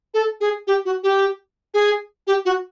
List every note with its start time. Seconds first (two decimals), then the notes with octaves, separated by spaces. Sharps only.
0.14 A4
0.41 G#4
0.67 G4
0.85 F#4
1.03 G4
1.74 G#4
2.27 G4
2.45 F#4